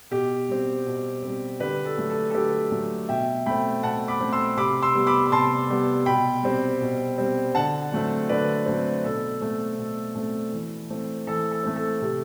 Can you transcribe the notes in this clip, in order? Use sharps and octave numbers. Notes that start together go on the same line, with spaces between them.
B2 G4
G3 C4
B2
G3 C4
D3 G4 B4
A4
F#3 A3
A4
A4
D3 G4 B4
F#3 A3
B2 E5 G5
A3 C4 G5 B5
B2 F#5 A5
B5 D6
A3 C4
C6 E6
C3 B5 D6
C6 E6
G3 B3
B5 D6
B5
C3 A5 C6
G3 B3
B2 G5 B5
G3 C4
B2
G3 C4
D3 F#5 A5
F#3 A3 C4
D3 B4 D5
F#3 A3 C4
B2 A4
A3 C4
B2
A3 C4
E3
A3 C4
E3 A4
A4
A3 C4
A4
C3